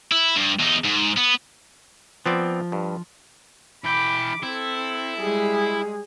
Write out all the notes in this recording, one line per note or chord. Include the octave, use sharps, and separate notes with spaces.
E4
G2
E2 D#4
G#2
B3
F3 B3 C4 D5
G2
E3 G5 B5 D6
C4 E4 A4
G3 G#3 G#4